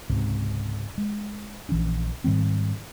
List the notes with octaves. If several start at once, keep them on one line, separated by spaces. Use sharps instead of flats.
C#2 G#2 C3
G#3
A#1 E3 C#4 D4
G#2 D#3 G3 C4